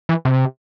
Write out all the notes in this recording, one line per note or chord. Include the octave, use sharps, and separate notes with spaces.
E3
C3